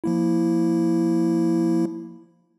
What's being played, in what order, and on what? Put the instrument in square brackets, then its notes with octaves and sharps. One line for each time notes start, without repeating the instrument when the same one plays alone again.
[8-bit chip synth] F3 A#3 E4